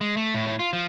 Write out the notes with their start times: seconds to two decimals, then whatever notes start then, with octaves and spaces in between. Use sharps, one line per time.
0.01 G#3
0.17 A3
0.35 A2
0.47 A2
0.59 F4
0.73 F3